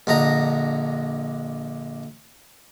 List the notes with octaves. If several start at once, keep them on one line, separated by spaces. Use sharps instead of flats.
A#1 D3 D#5 A#5